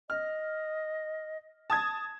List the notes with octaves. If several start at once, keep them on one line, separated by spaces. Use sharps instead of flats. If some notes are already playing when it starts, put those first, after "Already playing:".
D#5 F6
A5 D#6 G#6